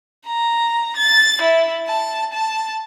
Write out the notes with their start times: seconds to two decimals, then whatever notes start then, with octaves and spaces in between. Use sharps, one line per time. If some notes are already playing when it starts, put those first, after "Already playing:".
0.27 A#5
0.96 A6
1.42 E4
1.88 A5
2.33 A5